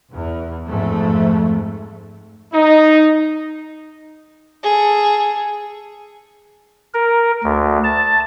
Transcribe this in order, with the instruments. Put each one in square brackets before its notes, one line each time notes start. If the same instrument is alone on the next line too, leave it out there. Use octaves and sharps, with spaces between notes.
[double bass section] E2
F2 G#2 A3
[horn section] D#4
[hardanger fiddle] G#4 A4
[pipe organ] A#4
D2
A5